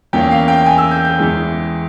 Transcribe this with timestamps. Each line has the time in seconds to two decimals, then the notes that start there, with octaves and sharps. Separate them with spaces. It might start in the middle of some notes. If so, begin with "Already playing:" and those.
0.13 E2 E3 A#3 C#4 G5
0.31 F5
0.48 G5
0.66 G#5
0.78 E6
0.91 G6
1.05 G6
1.18 E2 E3 G#3